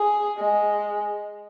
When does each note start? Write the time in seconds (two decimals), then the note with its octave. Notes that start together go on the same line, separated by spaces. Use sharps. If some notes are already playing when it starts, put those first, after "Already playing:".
Already playing: G#4
0.38 G#3